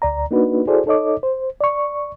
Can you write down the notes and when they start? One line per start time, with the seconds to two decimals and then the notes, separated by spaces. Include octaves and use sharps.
0.02 D2 D5 A#5
0.31 A#3 D4 D#4 F#4 B4
0.67 E4 F#4 G#4 A4 C5 D5
0.86 D#4 A4 C#5 D#5 D6
1.23 C5
1.61 D5 C#6